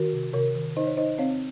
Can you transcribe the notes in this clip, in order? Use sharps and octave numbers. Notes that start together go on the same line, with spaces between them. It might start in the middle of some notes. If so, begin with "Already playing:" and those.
Already playing: D#3 F#4 A#4
C3
C3 A#4 C#5
D#3
D#4 C5 D#5
C#5
D#4 C5 D#5
C4 C#5 F5